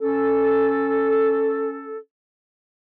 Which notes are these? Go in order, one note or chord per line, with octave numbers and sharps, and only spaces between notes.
C#4 A4